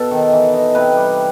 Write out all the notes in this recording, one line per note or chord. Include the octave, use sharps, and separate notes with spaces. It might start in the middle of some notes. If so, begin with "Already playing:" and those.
Already playing: B2 A4
D#3
E3
D#4
C3 B4
G3